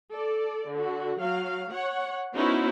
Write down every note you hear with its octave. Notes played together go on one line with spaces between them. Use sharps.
A4 D5
D3 F#4
F#3 F5
C#5 F#5
B3 C#4 D#4 E4 F#4 C5